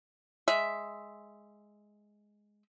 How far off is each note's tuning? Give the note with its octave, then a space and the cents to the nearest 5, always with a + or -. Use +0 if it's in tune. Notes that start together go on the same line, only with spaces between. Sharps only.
G#3 +0 E5 +0